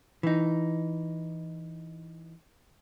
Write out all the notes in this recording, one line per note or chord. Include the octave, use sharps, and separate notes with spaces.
E3 D#4